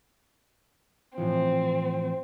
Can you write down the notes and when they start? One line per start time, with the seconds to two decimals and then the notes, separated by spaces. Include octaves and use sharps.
1.18 A2 E3 F3 C4